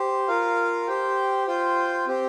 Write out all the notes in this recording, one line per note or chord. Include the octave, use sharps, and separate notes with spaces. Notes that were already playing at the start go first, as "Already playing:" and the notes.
Already playing: G4 C5
F4 A#4 F5
G4 C5 G5
F4 C5 G5
C4 G4 C5 G5